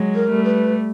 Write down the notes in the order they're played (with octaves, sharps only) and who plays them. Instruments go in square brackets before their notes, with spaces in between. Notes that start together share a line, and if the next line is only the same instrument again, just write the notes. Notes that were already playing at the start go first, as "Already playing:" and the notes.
Already playing: [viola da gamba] F#3 G#3
[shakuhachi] A#4
[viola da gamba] G3 A3
[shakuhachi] B4